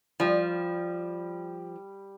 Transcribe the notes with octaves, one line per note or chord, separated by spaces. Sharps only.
F3 G3